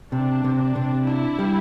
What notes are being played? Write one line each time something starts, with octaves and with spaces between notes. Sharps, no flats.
C3 D4
C3
D4
C3
D4 E4
G3